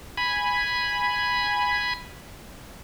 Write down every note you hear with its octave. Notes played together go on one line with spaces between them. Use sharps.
G#5 B5